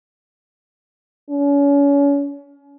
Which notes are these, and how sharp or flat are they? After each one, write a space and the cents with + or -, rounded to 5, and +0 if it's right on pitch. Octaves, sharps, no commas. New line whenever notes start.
C#4 +35